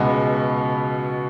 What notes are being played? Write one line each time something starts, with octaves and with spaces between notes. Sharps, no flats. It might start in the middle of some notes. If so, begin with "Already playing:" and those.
Already playing: C#2 B2 G#3 B3